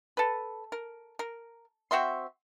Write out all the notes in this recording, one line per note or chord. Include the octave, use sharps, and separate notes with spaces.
A4 B4
A#4
A#4
C4 F#4 E5 C6